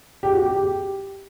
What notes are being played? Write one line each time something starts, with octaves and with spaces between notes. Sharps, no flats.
G4
F#4
G4
G4
G4